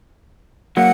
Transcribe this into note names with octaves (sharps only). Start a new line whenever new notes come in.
F#3 A#3 F#5